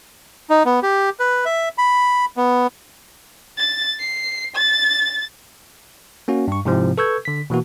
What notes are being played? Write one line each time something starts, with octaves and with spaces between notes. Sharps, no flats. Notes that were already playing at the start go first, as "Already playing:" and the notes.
D#4
B3
G4
B4
E5
B5
B3
A6
C7
A6
A#3 C#4 F#4
G2 C#6
G#2 C3 F3 C4 E4
A4 B4 C#6 E6 G6 G#6
D3 B6
B2 E3 A#3 F#4